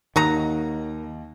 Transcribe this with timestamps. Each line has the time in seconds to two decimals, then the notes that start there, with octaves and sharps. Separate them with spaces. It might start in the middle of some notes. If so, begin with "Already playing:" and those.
0.16 D#2 D#3 F#3 D#4 A#5